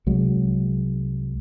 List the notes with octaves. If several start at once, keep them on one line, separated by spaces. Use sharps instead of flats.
C2 F#3 G#3